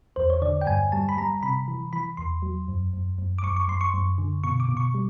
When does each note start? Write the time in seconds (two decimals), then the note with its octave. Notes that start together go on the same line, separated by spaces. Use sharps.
0.16 E2 C5
0.30 C#5
0.42 D3 D5
0.61 G5
0.67 G2 G#5
0.92 G3 A5
1.09 B5
1.17 G3 A#5
1.43 C3 B5
1.68 E3
1.93 E3 B5
2.17 E2 C6
2.42 F#3
2.68 F#2
2.93 F#2
3.18 F#2
3.38 D6
3.43 F#2 C#6
3.56 C#6
3.68 F#2 C6
3.81 C#6
3.94 F#2
4.18 D3
4.44 B2 C#6
4.60 D6
4.69 B2
4.77 C#6
4.94 G3